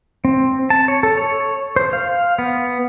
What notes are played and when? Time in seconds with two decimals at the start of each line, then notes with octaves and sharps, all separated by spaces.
0.25 C4
0.70 A5
0.88 C#5
1.03 A4
1.17 C#5
1.76 C5
1.93 F5
2.38 B3